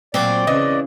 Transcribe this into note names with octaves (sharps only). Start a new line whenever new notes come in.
A#2 F#3 C4 D5
C#3 E3 D#5